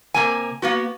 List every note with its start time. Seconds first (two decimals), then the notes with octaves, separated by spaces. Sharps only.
0.14 C3 A#3 G#5
0.62 A#3 B3 F#4